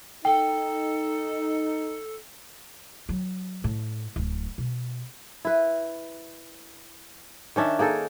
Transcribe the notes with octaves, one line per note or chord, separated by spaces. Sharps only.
D#4 A4 G5
F#3
A2
D1
B2
E4 B4
D#3 C#4 D4 E5
A#3 D#4 G#4 A4